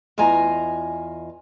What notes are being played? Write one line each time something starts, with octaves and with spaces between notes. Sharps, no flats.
E2 F4 D#5 G#5 A#5